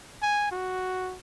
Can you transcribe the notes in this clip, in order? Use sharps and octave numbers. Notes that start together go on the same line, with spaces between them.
G#5
F#4